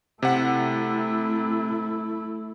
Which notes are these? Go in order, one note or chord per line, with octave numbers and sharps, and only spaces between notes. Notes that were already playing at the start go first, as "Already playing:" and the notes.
C3 A3 E4 F#5